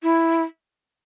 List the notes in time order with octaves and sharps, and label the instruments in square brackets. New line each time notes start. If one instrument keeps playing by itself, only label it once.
[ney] E4